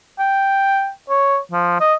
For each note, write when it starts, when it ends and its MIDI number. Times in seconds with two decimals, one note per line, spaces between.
0.19 0.90 79
1.10 1.38 73
1.52 1.79 53
1.80 1.94 75